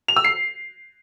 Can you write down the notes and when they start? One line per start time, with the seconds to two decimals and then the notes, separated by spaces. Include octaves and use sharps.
0.08 F7
0.16 E6
0.24 C7